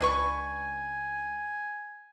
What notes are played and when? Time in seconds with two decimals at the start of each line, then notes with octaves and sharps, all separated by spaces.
0.01 C#2 D4 B4 G#5 C#6